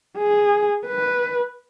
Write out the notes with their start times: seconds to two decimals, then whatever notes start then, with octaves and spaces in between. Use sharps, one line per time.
0.17 G#4
0.86 B4